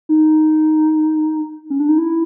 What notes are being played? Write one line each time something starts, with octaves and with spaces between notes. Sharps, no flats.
D#4
C#4
D4
D#4
E4